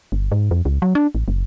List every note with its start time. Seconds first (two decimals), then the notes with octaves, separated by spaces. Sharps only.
0.12 G1
0.32 G#2
0.51 F2
0.65 C#2
0.82 F#3
0.95 D4
1.15 A1
1.28 F#1